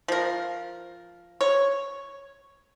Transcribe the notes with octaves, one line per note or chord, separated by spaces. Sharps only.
F3 A#4
C#5